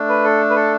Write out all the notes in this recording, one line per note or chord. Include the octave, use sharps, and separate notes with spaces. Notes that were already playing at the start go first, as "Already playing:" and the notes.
Already playing: A3 D4
B4
A4
B4
A4